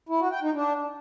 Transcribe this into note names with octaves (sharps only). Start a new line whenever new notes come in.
E4
F#4
G5
D#4
D4